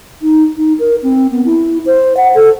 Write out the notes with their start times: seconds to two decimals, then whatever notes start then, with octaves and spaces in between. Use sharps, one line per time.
0.22 D#4
0.57 D#4
0.79 A#4
1.03 C4
1.31 B3
1.45 E4
1.86 C5
2.17 F#5
2.35 A4